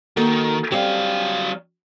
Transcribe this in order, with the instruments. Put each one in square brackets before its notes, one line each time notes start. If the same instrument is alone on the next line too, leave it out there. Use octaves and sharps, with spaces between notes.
[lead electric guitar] D#3 [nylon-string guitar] A#3 F#4 A4
[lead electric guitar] F#3 F5 [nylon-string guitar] G3 C4 G4